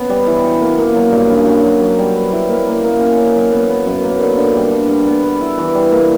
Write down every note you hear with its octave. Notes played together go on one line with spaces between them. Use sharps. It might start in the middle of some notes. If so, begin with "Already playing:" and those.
Already playing: B3 C#4
G3
E3
F#4
A#3
A#3
F#3
G2
C#4
F#3
F#3
F#3
G3
B4
E4
A#3
A#3
A#3
C#4
C#4
F#3
B3
B3
F#2
A#3
D3
D3
G3
D4
G3
B3
B4
E4
E3
G3
A#3